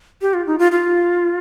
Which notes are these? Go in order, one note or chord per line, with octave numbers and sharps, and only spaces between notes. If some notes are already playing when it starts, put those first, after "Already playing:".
G4
F4
D#4
F4
F4